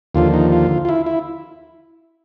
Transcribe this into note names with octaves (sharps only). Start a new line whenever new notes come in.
D#2 D3 F3 F4
D#4
F4
F4
E4
E4